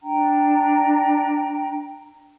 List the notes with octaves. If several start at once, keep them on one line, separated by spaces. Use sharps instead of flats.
D4 G5 A#5